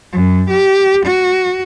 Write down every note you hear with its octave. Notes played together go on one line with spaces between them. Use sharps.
F#2
G4
F#4